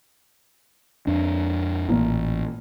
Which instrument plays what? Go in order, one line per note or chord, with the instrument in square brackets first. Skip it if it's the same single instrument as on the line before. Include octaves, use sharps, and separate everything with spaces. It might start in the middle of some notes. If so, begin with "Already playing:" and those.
[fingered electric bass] F2 D4
[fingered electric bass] A1 [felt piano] A#2 A#3 F4